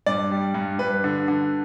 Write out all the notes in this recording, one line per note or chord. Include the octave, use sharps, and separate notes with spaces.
G2 D5
G3
G2
G2 B4
D3
D3